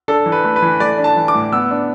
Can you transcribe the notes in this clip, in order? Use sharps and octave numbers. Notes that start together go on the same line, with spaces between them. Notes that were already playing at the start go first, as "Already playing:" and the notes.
D4 A4
E3
B4
A3
B4
E3
A3 D5
D4
A5
E3
D6
A2
B3 E6
D4